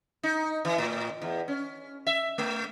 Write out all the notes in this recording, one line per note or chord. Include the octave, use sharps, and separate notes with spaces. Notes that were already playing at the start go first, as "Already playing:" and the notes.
D#4
E3
A2
E2
C#4
E5
A3